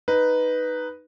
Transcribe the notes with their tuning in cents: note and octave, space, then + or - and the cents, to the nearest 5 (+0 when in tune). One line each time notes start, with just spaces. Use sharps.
D#4 +0 B4 +0